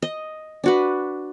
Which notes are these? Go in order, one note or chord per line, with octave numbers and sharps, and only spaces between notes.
D#5
D4 F#4 B4